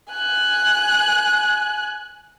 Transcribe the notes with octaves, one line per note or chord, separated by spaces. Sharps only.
G#5 F#6